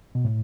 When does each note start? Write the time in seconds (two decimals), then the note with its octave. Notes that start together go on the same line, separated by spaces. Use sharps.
0.15 B2
0.25 A2